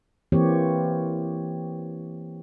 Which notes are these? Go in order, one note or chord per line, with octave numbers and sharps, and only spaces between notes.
E3 A#3 C4 G4 C#5